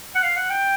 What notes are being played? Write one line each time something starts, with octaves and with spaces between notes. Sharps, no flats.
F#5
F5
F#5
G5